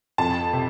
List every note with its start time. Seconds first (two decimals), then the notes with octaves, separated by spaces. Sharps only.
0.18 F2 A5
0.53 C3